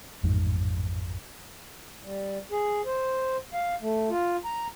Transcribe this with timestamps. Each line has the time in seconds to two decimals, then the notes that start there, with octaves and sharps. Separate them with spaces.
0.23 A1 F2 G#2 G#3
2.03 G3
2.52 G#4
2.86 C5
3.53 F5
3.81 A3
4.10 F4
4.45 A#5